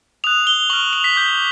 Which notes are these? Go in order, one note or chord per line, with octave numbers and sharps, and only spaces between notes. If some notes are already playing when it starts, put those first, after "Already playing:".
D#6 F#6 F7
G7
C#6 F6 F#7
F7
B6
D6 G6